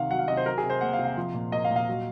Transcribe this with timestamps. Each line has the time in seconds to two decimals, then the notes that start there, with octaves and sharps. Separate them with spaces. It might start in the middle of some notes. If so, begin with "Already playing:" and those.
Already playing: C3 D#3 F5 F#5
0.10 F#3 F#5
0.19 F5
0.28 C3 D#5
0.37 C5
0.46 F#3 A#4
0.58 G#4
0.64 C3
0.70 C5
0.81 A#3 F#5
0.93 F5
0.99 C3
1.05 F5
1.17 F3
1.34 A#2
1.52 A#3 D#5
1.64 F5
1.70 A#2
1.76 F5
1.88 F#3